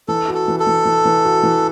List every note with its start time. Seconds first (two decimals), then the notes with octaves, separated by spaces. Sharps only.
0.08 E3 A4
0.28 F#4
0.34 A4
0.48 E3
0.60 A4
0.67 E3
0.85 E3
1.05 E3
1.25 F#4
1.43 E3